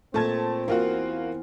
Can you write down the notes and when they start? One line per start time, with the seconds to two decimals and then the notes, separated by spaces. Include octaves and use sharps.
0.14 A#2 A3 C4 A5 G#6
0.68 E2 A#3 F4 F#4